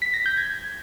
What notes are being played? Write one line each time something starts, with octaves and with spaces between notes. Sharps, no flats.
B6
A#6
G6
G#6